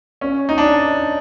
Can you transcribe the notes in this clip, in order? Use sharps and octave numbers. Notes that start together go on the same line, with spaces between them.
C#4
D#4
D4